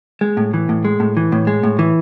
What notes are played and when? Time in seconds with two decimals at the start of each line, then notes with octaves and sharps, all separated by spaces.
0.21 G#3
0.37 A2
0.54 E3
0.69 A2
0.85 G#3
1.00 A2
1.17 E3
1.32 A2
1.47 G#3
1.63 A2
1.79 E3